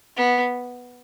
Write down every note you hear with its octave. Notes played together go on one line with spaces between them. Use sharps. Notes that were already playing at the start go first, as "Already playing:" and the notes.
B3